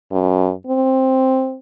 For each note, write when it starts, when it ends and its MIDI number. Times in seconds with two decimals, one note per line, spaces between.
0.12 0.52 42
0.67 1.57 60